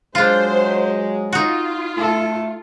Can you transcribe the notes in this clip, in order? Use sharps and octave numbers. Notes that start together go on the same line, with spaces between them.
F#3 G#3 D4 F4 C5
D#4 F4 F#4
A3 A4